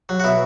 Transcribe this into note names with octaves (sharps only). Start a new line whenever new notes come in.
F#3
F#4
B2 E4